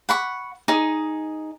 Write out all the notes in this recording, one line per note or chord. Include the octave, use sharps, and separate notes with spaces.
F#5 B5 C#6
D#4 G#4